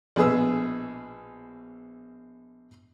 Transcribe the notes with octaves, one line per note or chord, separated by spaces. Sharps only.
A#1 B2 G#4 B4 E6